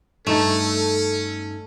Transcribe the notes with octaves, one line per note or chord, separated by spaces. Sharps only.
G2 A3 C#4 D#4 A4 A6